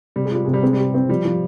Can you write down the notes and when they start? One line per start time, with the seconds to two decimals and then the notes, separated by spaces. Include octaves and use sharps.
0.16 C3 G3
0.25 G#3
0.31 G3 F4
0.45 C3 G#3
0.53 G3
0.63 G#3 C4
0.73 G3
0.78 G4
0.94 C4
1.09 F3 G3
1.25 F3